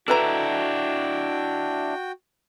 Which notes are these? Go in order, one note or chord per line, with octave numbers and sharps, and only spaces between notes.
D4 E4 F#4 A4 B4 G5 A#5